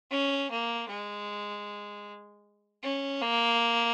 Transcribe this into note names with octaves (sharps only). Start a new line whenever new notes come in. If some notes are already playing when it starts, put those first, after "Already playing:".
C#4
A#3
G#3
C#4
A#3